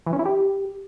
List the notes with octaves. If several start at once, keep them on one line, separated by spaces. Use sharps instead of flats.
E3
C#4
E4
G4